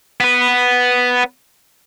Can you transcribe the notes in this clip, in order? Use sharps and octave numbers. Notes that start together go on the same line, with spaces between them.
B3 B4